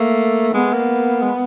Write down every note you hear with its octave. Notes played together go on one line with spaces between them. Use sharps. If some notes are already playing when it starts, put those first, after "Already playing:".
Already playing: A3 A#3
G#3 B3
A#3
G#3